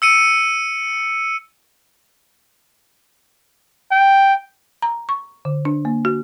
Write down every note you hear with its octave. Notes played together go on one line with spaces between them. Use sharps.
E6 C#7 D#7
G5
A#5
C#6
D3
D4
A#3
F#4